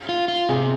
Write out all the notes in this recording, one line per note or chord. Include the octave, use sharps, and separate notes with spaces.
F4
F4
C3 G#4